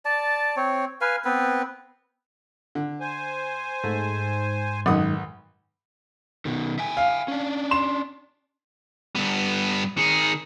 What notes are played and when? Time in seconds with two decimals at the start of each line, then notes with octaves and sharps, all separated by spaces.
0.05 D5 A5
0.57 C4 C#5
1.01 B4 F5 G#5
1.25 B3 C4 B4
2.75 D3
3.01 C5 G#5
3.84 G#2 A3
4.86 B1 F#2 D#3 F#5 D#6
6.45 B2 D#3
6.79 E5 G5 G#5
6.97 F5
7.28 C#4 D4
7.71 C6 E7
9.16 G2 B3
9.97 D#3 G#4 C#7